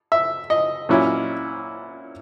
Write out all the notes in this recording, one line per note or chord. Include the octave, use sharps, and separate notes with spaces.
E5
D#5
A#2 F#3 C#4 E4